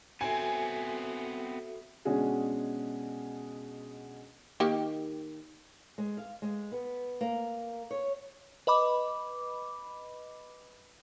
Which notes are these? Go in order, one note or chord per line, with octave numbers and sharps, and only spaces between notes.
B3 C4 F#4 A4 E5 G#5
B2 G#3 C#4 D4 F#4 G#4
D#3 A#3 G4
G#3
F5
G#3
B3
A#3
C#5
B4 D#5 B5 D6